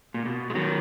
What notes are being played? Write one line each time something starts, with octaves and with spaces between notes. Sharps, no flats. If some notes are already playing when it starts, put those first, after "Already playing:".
A#2
B2
G#3
D#3 F#3